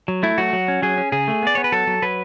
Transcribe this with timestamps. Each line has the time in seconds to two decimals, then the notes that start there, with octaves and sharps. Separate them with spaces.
0.08 F#3
0.23 A3 E4
0.38 F#3 F#4
0.53 F#3
0.68 C#4
0.82 F#3 G#4
0.98 C#4
1.12 C#3 G#4
1.28 A3
1.43 B3 D5
1.55 B3 C#5
1.64 B4
1.72 F#3 A4
1.87 F#3
2.02 F#3 B4